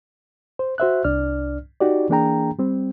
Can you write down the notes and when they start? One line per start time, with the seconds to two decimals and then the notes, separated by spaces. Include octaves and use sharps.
0.59 C5
0.78 F#4 C5 E5 F#6
1.04 C2 D4 D5 F6
1.81 D#4 F#4 G4 D5
2.09 E3 A#3 D4 G#4 G5 A#5
2.59 G3 C4